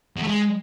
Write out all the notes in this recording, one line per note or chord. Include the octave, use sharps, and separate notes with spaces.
E2
A3
G#3